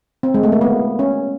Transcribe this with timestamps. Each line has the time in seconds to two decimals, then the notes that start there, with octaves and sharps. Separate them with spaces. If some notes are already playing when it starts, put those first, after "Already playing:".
0.23 C4
0.34 G#3
0.43 A3
0.52 A#3
0.61 B3
0.99 C#4